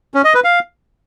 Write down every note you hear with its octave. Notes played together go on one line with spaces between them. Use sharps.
C#4
D#5
B4
F5